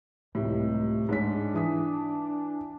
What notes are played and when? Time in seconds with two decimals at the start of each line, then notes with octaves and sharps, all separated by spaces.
0.35 C#2 A2 C3 G3
1.09 G#2 D4 C#5 B6
1.54 E3 D#6 B6